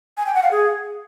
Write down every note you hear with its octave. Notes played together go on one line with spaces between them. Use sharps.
G#5
G5
F#5
F5
G#4